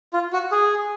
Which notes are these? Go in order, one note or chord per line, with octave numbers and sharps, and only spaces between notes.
F4
F#4
G#4